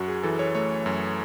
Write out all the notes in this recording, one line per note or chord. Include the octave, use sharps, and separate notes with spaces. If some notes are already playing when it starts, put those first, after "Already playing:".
Already playing: F#2 F#4
G#4
E3 A4
C#5
A3 C#5
F#2